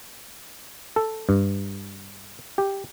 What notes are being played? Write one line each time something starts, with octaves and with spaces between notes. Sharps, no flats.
A4
G2
G4